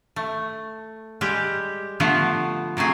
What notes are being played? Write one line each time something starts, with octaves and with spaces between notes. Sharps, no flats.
A3
G3 G#3 G4
D3 F3 A3 B3
C3 F#3 A3 G#4